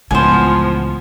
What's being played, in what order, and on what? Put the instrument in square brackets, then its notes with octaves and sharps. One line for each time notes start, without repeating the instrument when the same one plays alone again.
[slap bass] C#2 A2 [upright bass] E3 [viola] F3 B3 [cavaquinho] C5 G#5